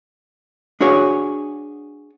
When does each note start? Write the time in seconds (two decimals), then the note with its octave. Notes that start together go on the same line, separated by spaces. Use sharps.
0.81 D4 F#4 G#4 C#5